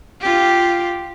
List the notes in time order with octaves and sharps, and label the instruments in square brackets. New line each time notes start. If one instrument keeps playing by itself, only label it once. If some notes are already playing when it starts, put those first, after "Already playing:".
[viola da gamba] F4 G4